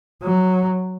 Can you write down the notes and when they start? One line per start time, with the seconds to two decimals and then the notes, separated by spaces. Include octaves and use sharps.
0.22 F#3